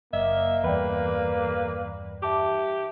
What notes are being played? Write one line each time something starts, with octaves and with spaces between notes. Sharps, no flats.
F#1 A#3 D#5 E5
E2 G2 B4 D5 G5 B5
G4 E5 A5 D6